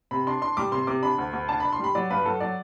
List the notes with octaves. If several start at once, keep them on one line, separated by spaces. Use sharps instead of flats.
C3 B5
D4 C6
D4 C6
G3 D6
C3 C6
C3 D6
D4 B5
D2
D2
D4 A5
D4 B5
C6
G3 B5
F#3 D5
G2 B4
F#3 A4
F#3 D5